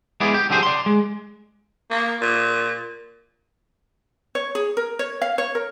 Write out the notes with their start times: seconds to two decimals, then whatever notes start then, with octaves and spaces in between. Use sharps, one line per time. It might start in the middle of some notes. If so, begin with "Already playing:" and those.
0.20 G#3 B3 E4 G#4 D5
0.34 G4
0.50 D3 F#3 G4 G#4 C5
0.63 D5 C6
0.86 G#3
1.90 A#3
2.21 A#2
4.35 C#5
4.55 G#4
4.77 A#4
4.99 C#5
5.22 F5
5.38 C#5
5.55 A#4